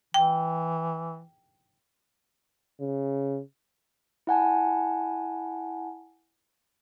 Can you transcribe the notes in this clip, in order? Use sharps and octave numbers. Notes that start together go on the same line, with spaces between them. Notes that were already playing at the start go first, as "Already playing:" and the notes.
E3 G5
C#3
E4 F#5 G#5 A5